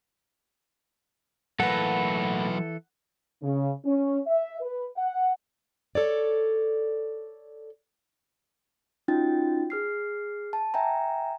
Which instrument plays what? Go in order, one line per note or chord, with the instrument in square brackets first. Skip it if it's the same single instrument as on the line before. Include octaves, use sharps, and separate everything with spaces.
[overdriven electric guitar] A2 A#3 [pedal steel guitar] E3 A4 [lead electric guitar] F#3 B4 [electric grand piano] F#5
[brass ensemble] C#3
C#4
E5
B4
F#5
[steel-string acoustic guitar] A4 C#5 D5
[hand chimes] C#4 D#4 F4 F#4 G5 A6
G#4 F6 C7
A5
E5 G5 G#5 A#5